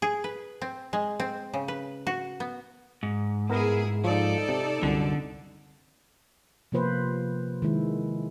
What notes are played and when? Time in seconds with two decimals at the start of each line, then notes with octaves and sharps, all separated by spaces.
0.02 G#4
0.24 B4
0.62 C4
0.93 G#3
1.20 C4
1.54 C#3
1.68 B4
2.07 F#4
2.40 B3
3.03 G#2
3.50 B3 E4 G#4 A#4 A#5
4.04 F3 D#4 A4 D5
4.49 C3
4.83 C2 F#2 D3
6.72 C3 F3 A#3 F4 B4 C5
7.62 D#3 G#3 E4